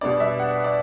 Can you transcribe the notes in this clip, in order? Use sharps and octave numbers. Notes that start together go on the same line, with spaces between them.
B2 G3 B3 D4 D5
E5
F#5
D5